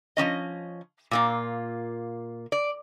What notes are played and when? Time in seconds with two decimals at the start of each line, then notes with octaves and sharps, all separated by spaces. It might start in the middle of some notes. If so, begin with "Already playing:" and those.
0.17 F3 G3 C#4 D#5
1.11 A#2 A#3 F4
2.52 D5